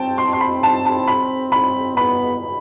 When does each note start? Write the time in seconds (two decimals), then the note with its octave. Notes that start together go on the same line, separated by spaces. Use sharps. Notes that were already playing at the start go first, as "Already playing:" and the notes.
Already playing: C4 G5 A5
0.18 C6
0.33 C6
0.41 B5
0.63 A5
0.85 A5
1.08 B5
1.52 B5
1.97 B3 B5